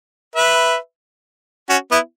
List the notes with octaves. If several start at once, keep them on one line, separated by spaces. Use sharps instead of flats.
B4 E5
C#4 F#4
B3 E4